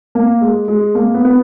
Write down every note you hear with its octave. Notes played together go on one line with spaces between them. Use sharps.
A#3
G#3
G#3
A#3
B3
B3